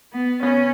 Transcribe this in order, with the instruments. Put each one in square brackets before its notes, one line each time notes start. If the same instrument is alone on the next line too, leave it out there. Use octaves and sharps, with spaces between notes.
[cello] B3
[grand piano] B3 [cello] C#4